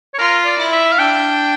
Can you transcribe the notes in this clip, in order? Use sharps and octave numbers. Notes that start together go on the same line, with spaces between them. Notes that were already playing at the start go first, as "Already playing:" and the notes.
C#5
F4 A#4
D5
E4
E5
F5
D4 G5